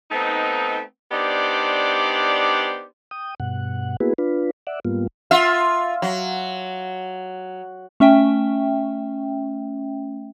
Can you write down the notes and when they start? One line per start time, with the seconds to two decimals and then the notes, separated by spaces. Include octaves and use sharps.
0.11 A3 B3 C4 D#4
1.11 B3 D4 D#4 G4 C5 D5
3.11 G5 D#6
3.40 G2 B2 F#5
4.00 A#3 B3 E4 F#4 G#4 B4
4.18 D4 F4 B4
4.67 D5 E5 F#5
4.85 G#2 G3 A#3 B3 F4
5.31 F4 E5
6.02 F#3
8.00 A3 C#4 E5 G5